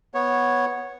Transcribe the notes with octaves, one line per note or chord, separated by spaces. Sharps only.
B3 C#5